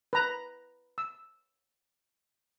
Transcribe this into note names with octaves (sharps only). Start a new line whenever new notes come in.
B4 A#5
E6